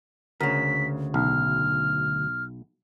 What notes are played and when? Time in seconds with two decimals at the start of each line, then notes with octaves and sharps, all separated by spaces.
0.41 D2 C#3 A#4 B6
1.14 B1 F6